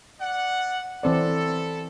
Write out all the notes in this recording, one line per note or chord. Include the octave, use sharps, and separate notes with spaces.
D5 F#5
E3 C4 E4 A4 D5